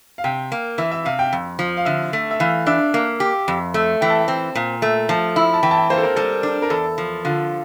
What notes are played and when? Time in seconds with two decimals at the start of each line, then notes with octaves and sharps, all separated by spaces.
0.18 F5
0.24 C3 G5
0.52 A#3
0.78 E3 E5
0.91 E5
1.05 C3 F5
1.19 G5
1.33 F2
1.59 F3
1.77 F5
1.85 D3 E5
2.13 A3
2.31 E5
2.40 E3 F5
2.66 D4 E5
2.94 A#3
3.20 G4
3.48 F2
3.74 A3
4.01 E3 G5
4.10 A5
4.19 G5
4.28 C4
4.55 A#2
4.82 A3
5.09 F3 A5
5.36 E4
5.54 A5
5.63 E3 G5
5.71 A5
5.77 G5
5.90 A#3 C5
5.97 A4
6.03 A#4
6.16 G3 A4
6.43 D4
6.62 A#4
6.70 E2 A4
6.98 F3
7.25 D3 F4